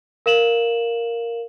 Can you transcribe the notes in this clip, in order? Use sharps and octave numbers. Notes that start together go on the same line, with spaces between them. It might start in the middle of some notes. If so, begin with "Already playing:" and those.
A#4 F5 E7 F#7